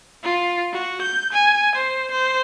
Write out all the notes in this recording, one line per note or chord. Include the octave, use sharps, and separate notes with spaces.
F4
F#4
G6
G#5
C5
C5